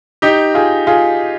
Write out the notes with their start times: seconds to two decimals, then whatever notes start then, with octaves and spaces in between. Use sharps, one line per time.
0.22 D#4 G4
0.54 F4 G#4
0.87 F4 G#4